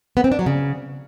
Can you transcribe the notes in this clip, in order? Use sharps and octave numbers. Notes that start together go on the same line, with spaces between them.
B3
C4
D4
F#3
C#3